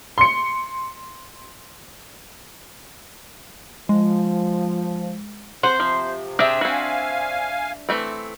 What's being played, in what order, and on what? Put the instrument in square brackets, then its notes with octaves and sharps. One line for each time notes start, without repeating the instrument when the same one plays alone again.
[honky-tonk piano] C6 C#7
[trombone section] F3 [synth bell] G#3
[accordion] C3 [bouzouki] C5 [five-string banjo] F#5
[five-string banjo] F3
[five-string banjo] C4 G4 G#4 [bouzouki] D4 E5
[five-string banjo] C4 F#4 [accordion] F5 G#5
[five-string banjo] E3 A3 C4